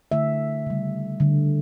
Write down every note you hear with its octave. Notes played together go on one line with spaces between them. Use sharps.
D3 A3 E5
C#3 G3
D3 G3